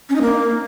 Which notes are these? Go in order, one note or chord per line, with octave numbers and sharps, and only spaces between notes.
C#4
D#4
A#3